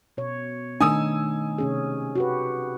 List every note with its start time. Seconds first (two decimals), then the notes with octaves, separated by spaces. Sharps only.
0.17 B2 C#5
0.80 D#3 A3 D4 D#4 G#5 D#6 E6
1.58 C3 C#4 G#4
2.16 F#4 G4 B4